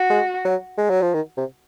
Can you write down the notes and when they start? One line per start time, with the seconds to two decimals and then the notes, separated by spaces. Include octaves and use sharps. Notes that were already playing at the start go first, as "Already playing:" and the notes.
Already playing: F#4
0.10 G#3
0.45 F#3
0.78 G#3
0.90 F#3
1.02 F3
1.14 D#3
1.37 C3